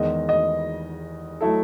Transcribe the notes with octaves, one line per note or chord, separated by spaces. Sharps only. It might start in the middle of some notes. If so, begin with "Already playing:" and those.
Already playing: E2 D#3 G#3 D#5
D#5
F#3 A3 E4 A4